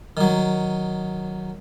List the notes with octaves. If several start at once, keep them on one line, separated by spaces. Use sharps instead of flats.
D#3 F#3